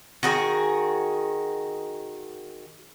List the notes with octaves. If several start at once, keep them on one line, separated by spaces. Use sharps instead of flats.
D#3 F#4 G#4